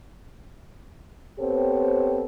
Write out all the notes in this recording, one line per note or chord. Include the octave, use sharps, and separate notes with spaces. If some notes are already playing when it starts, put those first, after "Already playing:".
B3 C4 G4 A4 C5 C#5